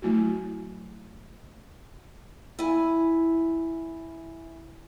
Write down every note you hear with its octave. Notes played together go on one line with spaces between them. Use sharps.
F#3 A3 E4 F#4
E4 G#5